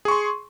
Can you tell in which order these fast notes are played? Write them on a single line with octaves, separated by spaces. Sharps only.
G#4 C#6 C6